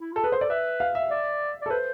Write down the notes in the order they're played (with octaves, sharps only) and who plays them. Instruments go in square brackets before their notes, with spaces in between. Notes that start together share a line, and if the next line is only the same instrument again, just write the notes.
[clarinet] E4
[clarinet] F4 [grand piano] A4
[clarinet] G#4 [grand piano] B4
[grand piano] C5
[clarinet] A4 [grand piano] D5
[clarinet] B4 [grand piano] E5
[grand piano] F5
E5
[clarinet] D5
D5
[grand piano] A4
[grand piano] B4 [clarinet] C5